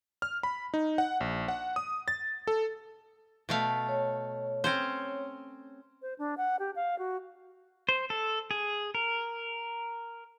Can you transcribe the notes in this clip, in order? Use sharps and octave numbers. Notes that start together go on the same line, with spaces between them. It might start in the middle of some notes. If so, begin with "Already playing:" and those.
F6
B5
D#4
F#5
A#1
F#5
D#6
A6
A4
B2 A3 F5
C#5
C4 C#4 C5
C5
D4
F#5
G4
F5
F#4
C5
A4
G#4
A#4